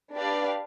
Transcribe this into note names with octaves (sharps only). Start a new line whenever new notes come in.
D4 G4 B4 D5 F5